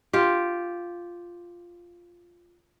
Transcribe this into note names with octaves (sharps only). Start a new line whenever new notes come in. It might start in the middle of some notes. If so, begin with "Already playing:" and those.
F4 G4